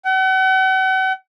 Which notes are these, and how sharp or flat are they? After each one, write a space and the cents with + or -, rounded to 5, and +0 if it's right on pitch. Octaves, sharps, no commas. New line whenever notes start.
F#5 +40